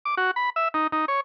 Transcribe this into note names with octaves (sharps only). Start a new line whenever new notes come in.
D6
F#4
B5
E5
D#4
D#4
C#5